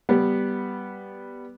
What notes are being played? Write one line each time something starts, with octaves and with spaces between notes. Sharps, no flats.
G3 B3